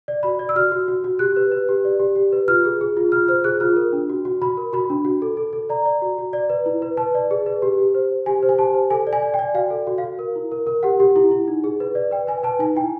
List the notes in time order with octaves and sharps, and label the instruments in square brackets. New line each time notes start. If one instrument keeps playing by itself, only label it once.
[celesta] D5
F#4 B5
D5
E6
F#4 F6
F#4
F#4
F#4
G4 F#6
B4
B4
G4
D5
G4
G4
B4
F4 F6
G#4
G#4
F4
F4 F6
C5 F6
G#4 F#6
F4 F6
A#4
D4
F#4
F#4
F#4 B5
A#4
F#4 B5
D4
F#4
A4
A4
A4
D5 A#5
D5
F#4
F#4
D5
B4
E4
B4
B4 A5
D5
G#4
B4
G4
G4
C5
C5
G4 G#5
C5
G#5
G4 A5
C5
A4 G#5
D5
G#5
D5
G5
D5
F#4 F5
A4
F#4
F5
F#4
A#4
E4
A#4
A#4
G4 F#5
G4
E4
E4
D#4
G#4
B4
D5
B4 G5
B4 G#5
B4 A5
D#4 G#5
E4 G5